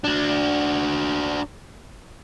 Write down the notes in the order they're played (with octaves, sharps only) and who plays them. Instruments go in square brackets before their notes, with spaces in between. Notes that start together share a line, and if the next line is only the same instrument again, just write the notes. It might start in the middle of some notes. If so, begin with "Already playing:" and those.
[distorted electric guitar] D4 F#4